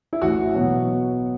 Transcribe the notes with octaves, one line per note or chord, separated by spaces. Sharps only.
E4
A1 A2 E3 F#4
B2 F#3 B3